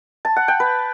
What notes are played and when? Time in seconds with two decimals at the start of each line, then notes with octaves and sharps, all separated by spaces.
0.25 A5
0.36 F#5
0.48 G5
0.60 B4